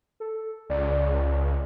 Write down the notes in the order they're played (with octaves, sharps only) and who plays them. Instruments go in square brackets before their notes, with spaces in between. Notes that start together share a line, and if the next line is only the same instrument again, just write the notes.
[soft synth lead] A4
[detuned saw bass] C#2 [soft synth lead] D5